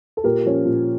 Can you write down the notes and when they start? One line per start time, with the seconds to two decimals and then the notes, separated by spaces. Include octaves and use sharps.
0.17 A4
0.24 A#2 G4 A#4
0.45 F3 C#4
0.65 A#2